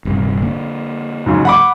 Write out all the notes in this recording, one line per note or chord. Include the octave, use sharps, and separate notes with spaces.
D#1 G2 C3
D3 A#3
G#2 C#3 F#3
F#5 B5 D6